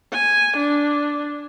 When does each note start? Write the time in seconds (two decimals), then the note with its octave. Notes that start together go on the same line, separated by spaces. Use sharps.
0.12 G#5
0.57 D4